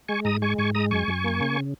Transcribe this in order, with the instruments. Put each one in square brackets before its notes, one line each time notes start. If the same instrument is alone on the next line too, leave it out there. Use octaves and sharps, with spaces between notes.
[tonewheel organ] G#3 G#5 C#6
G#2 A#5 D#6
G#3 G#5 C#6
G#2 G#5 C#6
G#3 A#5 D#6
F#2 G#5 C#6
F#2
A#3
C#3